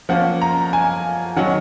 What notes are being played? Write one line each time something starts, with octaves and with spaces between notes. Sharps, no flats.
F3 A#3 C#4 F#5
A#5
G#5
D#3 F#3 C#4 F#5